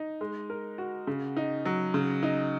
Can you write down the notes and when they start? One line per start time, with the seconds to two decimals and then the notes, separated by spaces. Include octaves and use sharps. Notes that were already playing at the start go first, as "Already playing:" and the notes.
Already playing: D#4
0.21 G#3
0.50 A#4
0.78 F#4
1.07 C#3
1.37 D#4
1.65 F#3
1.94 C#3
2.23 D#4